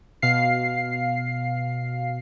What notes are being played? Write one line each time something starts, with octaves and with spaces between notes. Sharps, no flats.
B2 F5 C7